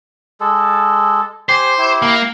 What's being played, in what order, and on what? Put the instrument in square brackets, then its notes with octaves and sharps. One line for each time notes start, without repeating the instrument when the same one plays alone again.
[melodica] G#3 A4
[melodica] G4 G#5 [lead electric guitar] C5
[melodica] E4 G4
[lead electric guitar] A#3